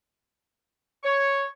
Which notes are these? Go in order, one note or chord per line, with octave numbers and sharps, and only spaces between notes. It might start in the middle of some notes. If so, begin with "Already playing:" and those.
C#5